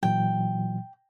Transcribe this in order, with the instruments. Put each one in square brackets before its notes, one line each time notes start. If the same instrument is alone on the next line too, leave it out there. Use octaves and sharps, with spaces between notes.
[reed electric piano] A#2 E3 F#3 [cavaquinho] G5